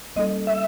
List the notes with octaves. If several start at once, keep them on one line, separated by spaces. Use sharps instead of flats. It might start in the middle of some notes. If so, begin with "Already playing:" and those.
G3 A#3 C#4 E4 A4 D#5
E5